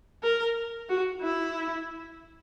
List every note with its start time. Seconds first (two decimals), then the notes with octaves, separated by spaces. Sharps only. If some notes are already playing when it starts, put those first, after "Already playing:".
0.23 A#4
0.89 F#4
1.22 E4